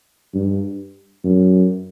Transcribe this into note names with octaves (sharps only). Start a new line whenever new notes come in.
G2
F#2